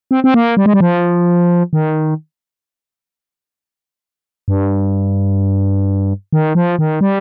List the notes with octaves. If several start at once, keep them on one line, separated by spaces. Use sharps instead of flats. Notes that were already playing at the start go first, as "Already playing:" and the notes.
C4
C4
A#3
G3
G#3
G3
F3
D#3
G2
D#3
F3
D#3
G3